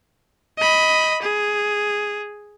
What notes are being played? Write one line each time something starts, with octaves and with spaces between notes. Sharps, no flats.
D#5 B5
G#4